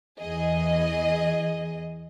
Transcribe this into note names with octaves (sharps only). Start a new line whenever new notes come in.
E2 E3 G#4 D#5